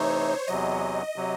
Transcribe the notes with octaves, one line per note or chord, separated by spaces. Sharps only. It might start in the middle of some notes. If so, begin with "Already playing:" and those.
Already playing: C3 E3 A3 D#4 C5 C#5
E2 C3 F#3 D#5
C3 F#3